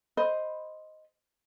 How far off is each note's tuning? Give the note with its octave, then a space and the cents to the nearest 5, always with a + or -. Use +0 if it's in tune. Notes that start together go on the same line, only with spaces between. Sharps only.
C5 +0 D#5 +0 B5 +0